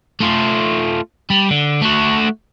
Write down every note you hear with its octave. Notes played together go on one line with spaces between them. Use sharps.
A3 F4
G3
D3
A3 F#4